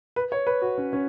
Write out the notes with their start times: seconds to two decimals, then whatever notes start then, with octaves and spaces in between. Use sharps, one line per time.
0.16 B4
0.32 C#5
0.47 B4
0.62 F#4
0.78 C#4
0.93 C#4